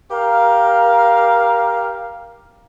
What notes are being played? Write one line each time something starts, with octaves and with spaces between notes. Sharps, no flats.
G4 A#4 F5